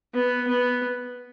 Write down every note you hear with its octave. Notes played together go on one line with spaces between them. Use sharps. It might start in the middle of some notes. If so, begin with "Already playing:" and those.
B3
B3